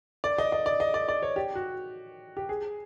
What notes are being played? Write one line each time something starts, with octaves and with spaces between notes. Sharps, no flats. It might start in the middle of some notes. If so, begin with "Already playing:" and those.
D5
D#5
D#5
D5
D#5
D5
D5
C#5
G4
F#4
G4
G#4